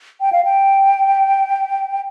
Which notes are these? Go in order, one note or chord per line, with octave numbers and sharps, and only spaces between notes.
G5
F5
G5